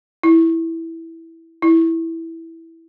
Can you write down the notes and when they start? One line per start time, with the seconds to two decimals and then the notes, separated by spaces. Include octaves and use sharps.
0.23 E4
1.62 E4